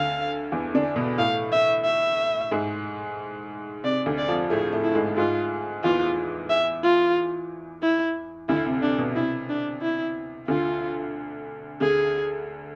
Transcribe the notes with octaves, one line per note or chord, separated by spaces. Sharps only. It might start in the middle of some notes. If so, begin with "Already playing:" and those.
Already playing: D2 D3 F5
E2 E3
D3 D4
B2 B3
A2 A3 F5
E5
E5
G#2 G#3
C3 D5
D2 D3
D5
F2 F3
A2 A3 G#4
A2 A3
E4
G#2 G#3
G#2 G#3 F4
E2 E3 F4
E5
F4
E4
D2 D3 E4
C3
C3 D4
B2
C3 E4
D4
E4
D2 D3 F4
D2 D3 G#4